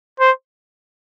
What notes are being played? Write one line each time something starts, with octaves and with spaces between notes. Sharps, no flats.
C5